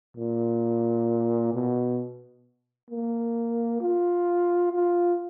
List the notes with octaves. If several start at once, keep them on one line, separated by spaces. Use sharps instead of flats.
A#2
B2
A#3
F4
F4